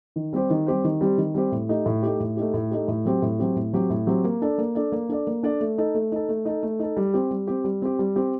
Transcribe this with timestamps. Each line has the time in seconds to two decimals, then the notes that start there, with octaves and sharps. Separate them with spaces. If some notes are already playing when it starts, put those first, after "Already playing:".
0.16 D#3
0.33 G3 C4 G4 C5
0.50 D#3
0.67 G3 C4 G4 C5
0.84 D#3
1.01 G3 C4 G4 C5
1.18 D#3
1.34 G3 C4 G4 C5
1.52 A2
1.69 A3 D#4 G4
1.86 A2
2.03 A3 D#4 G4
2.20 A2
2.37 A3 D#4 G4
2.54 A2
2.71 A3 D#4 G4
2.88 A2
3.05 F#3 C4 G4
3.22 A2
3.39 F#3 C4 G4
3.56 A2
3.73 F#3 C4 G4
3.90 A2
4.07 F#3 C4 G4
4.24 A#3
4.42 D4 A4 D5
4.58 A#3
4.75 D4 A4 D5
4.92 A#3
5.09 D4 A4 D5
5.27 A#3
5.43 D4 A4 D5
5.61 A3
5.78 D#4 A4
5.94 A3
6.12 D#4 A4
6.29 A3
6.45 D#4 A4
6.63 A3
6.79 D#4 A4
6.97 G3
7.14 C4 G4
7.31 G3
7.47 C4 G4
7.64 G3
7.82 C4 G4
7.99 G3
8.16 C4 G4